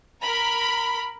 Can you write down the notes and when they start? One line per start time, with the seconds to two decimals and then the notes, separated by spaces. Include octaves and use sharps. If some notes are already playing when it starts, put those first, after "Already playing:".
0.23 A#4 B5